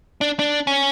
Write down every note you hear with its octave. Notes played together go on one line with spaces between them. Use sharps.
D4
D4
C#4